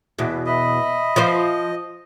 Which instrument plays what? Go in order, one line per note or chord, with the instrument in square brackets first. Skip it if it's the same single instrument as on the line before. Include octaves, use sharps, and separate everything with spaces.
[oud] E2 B2
[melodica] D#5 [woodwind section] E5 B5
[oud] F3 F4 C5